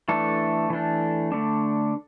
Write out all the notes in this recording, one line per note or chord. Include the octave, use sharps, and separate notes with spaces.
E3 A3 D4 A4
E3 A3 D4
D3 A3 D4